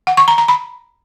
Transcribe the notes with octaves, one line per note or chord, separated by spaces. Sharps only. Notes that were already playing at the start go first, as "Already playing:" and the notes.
F#5
C#6
A#5
A#5
B5